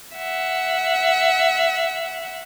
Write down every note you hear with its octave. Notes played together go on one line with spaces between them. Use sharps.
E5 F#5